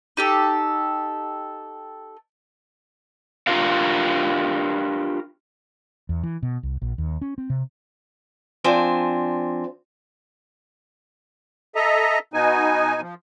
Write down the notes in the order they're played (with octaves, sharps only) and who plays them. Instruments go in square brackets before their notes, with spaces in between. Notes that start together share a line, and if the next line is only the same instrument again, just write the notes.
[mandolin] D#4 G4 A4
[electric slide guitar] D4 F4 G4 A#4 F5
[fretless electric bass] E2
E3
B2
C2
A#1
D#2
C#4
C4
C3
[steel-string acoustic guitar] F3 C4 D4 G#5
[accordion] A4 D#5 E5 A#5
B2 B3 D#4 G#5
F3